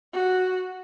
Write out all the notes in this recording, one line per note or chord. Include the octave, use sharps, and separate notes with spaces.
F#4